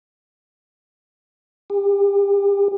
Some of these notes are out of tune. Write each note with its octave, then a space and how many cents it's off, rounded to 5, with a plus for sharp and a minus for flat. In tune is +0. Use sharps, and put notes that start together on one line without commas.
G4 +35